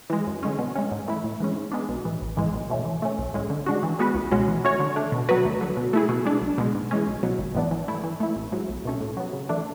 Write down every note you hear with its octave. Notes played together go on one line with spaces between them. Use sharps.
E3 G#3
F#2
D3 G#3 C#4
B2
G#3 C#4
G#2
E3 A3 E4
A2
E3 G#3 C#4
G#2
G#3 B3 D4
B1
A2 E3
A1
G#2 E3 G#3
B1
B2 A3 C#4
E3
A3 C#4
B1
A2 G#3 C#4
D3
G#3 D4 F#4
E3
G#3 B3 F#4 B4
C#2
B2 G#3 C#4 F#4
E3
A3 C#4 F#4 C#5
D3
A3 D4
B2
F#3 B3 F#4 B4
D2
D3 F#3
B2
A3 E4 G#4
B2
G#3 D4
B1
B2 G#3
G#2
E3 G#3 C#4
B1
B2 F#3
G#1
G#2 E3 B3 D4
E3
A3 E4
E3
A3 E4
A1
G#2 F#3
B1
B2 A3 C#4
A2
F#3 B3
C#3
E3 A3 D4